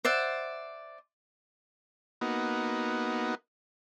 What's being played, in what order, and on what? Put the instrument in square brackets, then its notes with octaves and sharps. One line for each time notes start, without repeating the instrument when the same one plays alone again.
[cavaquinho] C5 D5 E5 F#5
[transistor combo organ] A#3 B3 D#4 F#4